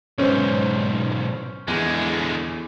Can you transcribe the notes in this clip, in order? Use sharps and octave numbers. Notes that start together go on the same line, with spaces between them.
B1 G#2 B3 C#4 C5
E2 D3 G#3